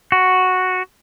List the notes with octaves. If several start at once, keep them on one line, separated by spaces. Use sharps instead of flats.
F#4